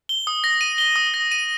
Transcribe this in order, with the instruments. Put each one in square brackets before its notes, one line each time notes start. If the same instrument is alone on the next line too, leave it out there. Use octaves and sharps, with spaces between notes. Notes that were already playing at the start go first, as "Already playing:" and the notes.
[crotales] G7
D#6
A#6
D#7
G7
D#6
A#6
D#7